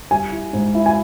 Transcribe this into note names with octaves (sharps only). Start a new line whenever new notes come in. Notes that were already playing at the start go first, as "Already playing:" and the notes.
G3 G#5
E4
G#2
E4
G#5